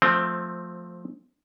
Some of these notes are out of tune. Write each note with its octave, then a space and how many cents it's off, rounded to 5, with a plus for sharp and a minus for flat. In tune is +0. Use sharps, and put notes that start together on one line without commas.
F3 +15 A3 +0 C4 +0